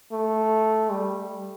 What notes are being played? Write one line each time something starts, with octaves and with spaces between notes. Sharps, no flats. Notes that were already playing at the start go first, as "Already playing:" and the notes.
A3
G3